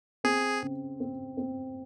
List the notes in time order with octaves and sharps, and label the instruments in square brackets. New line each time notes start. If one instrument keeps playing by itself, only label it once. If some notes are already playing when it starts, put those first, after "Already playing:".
[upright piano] C4 [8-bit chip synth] G#4
[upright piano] C#3
C4
C4